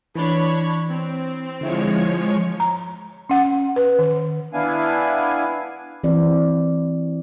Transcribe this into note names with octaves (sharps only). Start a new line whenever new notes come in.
E3 D4 C#5 B5
C4
D3 F3 G#3 E4 C#5
A#5
C#4 F#5
B4
D#3
B3 D4 E4 F5 G#5
E3 C4 D5